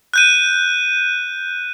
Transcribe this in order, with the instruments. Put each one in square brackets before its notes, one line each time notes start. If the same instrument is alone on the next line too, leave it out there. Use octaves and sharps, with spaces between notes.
[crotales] F#6 G6 D#7